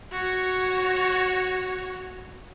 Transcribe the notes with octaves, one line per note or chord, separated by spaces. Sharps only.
F#4 C#5